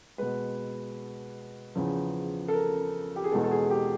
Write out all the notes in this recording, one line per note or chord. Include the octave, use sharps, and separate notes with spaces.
B2 G#3 B4
E2 C#3 F3
A4
A#4
G4
G#4
E2 B2 G#3 A4
A4
G#4
G4